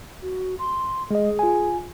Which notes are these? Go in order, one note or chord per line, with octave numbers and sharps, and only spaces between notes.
F#4
C6
G#3 G#4 D#5
F4 G#5